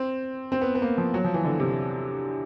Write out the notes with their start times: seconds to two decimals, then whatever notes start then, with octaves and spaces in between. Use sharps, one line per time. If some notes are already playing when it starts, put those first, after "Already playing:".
Already playing: C4
0.52 C4
0.61 B3
0.75 B3
0.82 A#3
0.98 F3
1.14 F#3
1.24 F3
1.34 E3
1.45 D3
1.60 C3